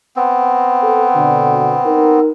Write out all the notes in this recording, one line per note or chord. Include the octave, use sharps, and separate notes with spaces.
B3 C4
A4
B2 D3
D#4 A#4